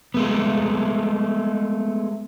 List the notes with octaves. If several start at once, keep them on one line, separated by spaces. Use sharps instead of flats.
G#3 A3 B3